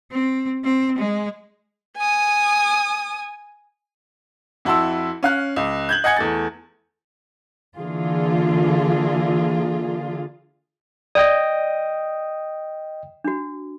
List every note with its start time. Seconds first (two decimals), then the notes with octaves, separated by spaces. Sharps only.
0.11 C4
0.64 C4
0.98 G#3
1.97 G#5 D#6
4.65 F2 E4 F#4 A5 C6 E6
5.23 C#4 F5 F#6
5.56 C#2
5.89 G6 G#6 F#7
6.04 D#5 F#5 G#5 G#6 C#7
6.16 E2 A3 A6
7.78 D3 E3 A#3 F4 G#4
11.15 D5 D#5 G5 D#6
13.24 D4 F#4